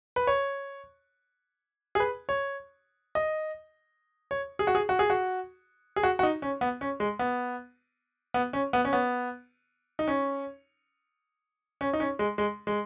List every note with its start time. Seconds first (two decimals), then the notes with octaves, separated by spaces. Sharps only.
0.16 B4
0.27 C#5
1.95 G#4
2.00 B4
2.29 C#5
3.15 D#5
4.31 C#5
4.59 G#4
4.67 F#4
4.75 G#4
4.89 F#4
4.99 G#4
5.10 F#4
5.96 G#4
6.03 F#4
6.19 F#4
6.23 D#4
6.42 C#4
6.61 B3
6.81 C#4
7.00 G#3
7.19 B3
8.34 B3
8.53 C#4
8.73 B3
8.85 C#4
8.93 B3
9.99 D#4
10.08 C#4
11.81 C#4
11.93 D#4
12.00 C#4
12.19 G#3
12.38 G#3
12.67 G#3